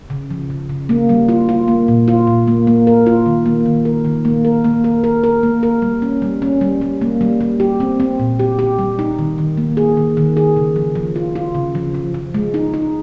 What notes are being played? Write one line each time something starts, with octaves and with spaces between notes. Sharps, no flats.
C#3
F3
C#3
C#3
A#3
G3
F4
F4
A#3
A#2
F4
A#2
A#3
A#3
A#4
F4
D#3
A#3
D#3
A#4
D#3
A#3
A#4
A#3
A#4
A#4
A#4
A#3
A#4
G3
C#4
G3
C#4
G3
G3
A#3
G3
G3
G4
C4
C4
A#2
G4
G4
G3
D#4
D#3
D#3
A#3
G#4
D#3
D#3
G#4
C#3
F3
F3
F4
F4
C#3
F3
F3
F3
G#3
D#4
D#4